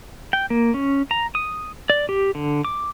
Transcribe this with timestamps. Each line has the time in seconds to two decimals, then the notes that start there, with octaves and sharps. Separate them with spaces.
0.33 G5
0.50 A#3
0.74 C#4
1.11 A#5
1.35 D#6
1.90 D5
2.09 G4
2.35 D3
2.65 D6